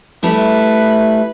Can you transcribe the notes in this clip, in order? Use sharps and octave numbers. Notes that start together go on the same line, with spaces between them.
G3 A3 E4 B4